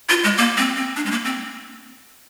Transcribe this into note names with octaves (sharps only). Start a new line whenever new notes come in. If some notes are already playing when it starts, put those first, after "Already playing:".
F4
G#3
A#3
C4
C4
D4
G#3
A#3
C4